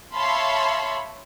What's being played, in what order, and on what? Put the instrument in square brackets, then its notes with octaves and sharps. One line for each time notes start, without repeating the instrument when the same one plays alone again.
[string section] C#5 E5 F5 A5 B5 C6